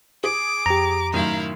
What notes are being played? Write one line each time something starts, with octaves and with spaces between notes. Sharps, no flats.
G#4 D6
F2 G4 A#5
F#2 A2 D#3 E4 F5